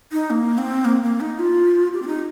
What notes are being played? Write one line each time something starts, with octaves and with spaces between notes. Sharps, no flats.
D#4
A#3
C4
A#3
A#3
D#4
F4
G4
C4
D#4